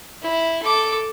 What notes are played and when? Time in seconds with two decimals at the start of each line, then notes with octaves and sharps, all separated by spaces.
0.22 E4
0.62 A4 D6